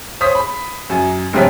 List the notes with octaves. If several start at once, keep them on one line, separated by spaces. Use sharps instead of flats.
C5 C#5 D#6 B6
B5
F#2 G#5
F1 A#1 G2 C3 C#4 B6